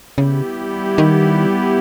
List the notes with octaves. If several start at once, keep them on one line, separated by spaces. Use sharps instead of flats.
C#3 G3 B3 E4 G4
D#3